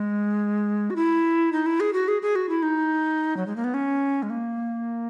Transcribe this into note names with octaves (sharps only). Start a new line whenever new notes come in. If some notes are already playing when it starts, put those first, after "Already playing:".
Already playing: G#3
F#4
E4
D#4
E4
G#4
F#4
G#4
G#4
F#4
E4
D#4
F#3
G#3
A#3
B3
C#4
G#3
A#3